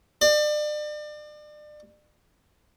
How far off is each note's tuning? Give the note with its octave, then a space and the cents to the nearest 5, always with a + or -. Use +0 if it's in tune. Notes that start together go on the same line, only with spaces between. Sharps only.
D5 +35